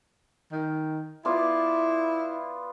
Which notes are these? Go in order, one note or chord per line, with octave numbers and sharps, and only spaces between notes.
D#3
B3 E4 F4 D5